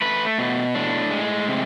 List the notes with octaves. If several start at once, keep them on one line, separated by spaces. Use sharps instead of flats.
A3 B4
B2
A2 D4
G#3
C3